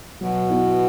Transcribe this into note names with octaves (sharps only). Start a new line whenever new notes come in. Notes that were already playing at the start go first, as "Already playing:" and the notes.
B2 F#3
B3 E4